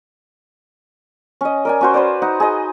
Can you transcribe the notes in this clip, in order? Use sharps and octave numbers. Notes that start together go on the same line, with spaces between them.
C#4 D#5
A#4 D5 G#5
C#4 F#4 C5
B4 C5 D5
D#4 F#5
G#4 D#5